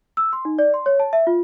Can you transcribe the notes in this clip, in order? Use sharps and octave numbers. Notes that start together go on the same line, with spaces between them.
E6
C6
D#4
D5
C6
C#5
A5
E5
F4